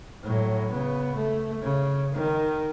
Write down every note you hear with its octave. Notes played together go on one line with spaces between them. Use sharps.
A2 F#3
C#3 B3
A3
C#3
D#3